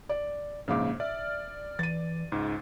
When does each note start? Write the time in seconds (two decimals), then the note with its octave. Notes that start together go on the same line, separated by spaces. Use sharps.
0.09 D5
0.68 A#1 G#2 C#3 A#3 F5 D6
1.00 D5 E5 F6
1.79 E3 A6 D#7
2.32 C#2 G#2 D#4